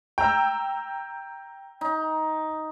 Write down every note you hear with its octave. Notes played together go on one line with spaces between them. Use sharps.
G5 A#5 E6
D#4